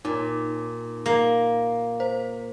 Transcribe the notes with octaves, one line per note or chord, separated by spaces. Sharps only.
A#2 D#4
A#3
C5